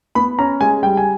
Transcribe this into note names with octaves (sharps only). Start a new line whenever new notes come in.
B3 B5
C#4 A#5
G#3 G#5
G3 G5
G#5